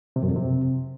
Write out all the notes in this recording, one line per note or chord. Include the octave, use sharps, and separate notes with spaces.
C3
F#2
F2
C3